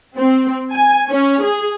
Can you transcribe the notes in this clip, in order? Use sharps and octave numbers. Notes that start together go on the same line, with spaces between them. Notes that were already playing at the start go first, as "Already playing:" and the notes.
C4
G#5
C#4
G#4